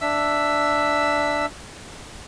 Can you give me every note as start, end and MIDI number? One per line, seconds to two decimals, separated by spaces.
0.01 1.46 62
0.01 1.46 76
0.01 1.46 88